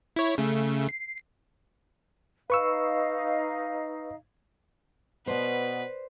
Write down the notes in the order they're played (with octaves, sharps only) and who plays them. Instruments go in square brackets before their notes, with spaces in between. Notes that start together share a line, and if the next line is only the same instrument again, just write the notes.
[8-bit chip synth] E4 C#5
C#3 A3
C7
[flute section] D#4 F5 [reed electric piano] B4 C#6 E6
[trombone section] B2 B3 [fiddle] B4 [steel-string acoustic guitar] C5 D5